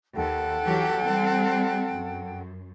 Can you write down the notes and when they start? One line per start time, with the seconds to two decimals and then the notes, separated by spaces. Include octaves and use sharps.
0.16 D#2 A4 F#5 G5
0.63 E3 F#3 G4
1.03 G3 C4
1.92 F#2